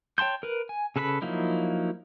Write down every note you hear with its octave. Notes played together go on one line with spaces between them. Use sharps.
C#5 G5 A5 C6 G6
A#4 B4
G#5
C#3 A4 B4 D5 B5
F3 F#3 A#3 D#4 E4